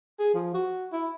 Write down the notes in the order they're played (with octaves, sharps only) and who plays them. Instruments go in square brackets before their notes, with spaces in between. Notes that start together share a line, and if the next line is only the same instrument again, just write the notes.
[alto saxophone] G#4
F3
F#4
E4